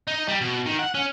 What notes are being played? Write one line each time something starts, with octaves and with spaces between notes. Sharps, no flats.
D#4
G3
B2
D#3
F#5
C#4